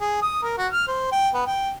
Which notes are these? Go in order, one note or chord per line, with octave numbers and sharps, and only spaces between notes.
G#4
D#6
A#4
F#4
F6
C5
G5
B3
G5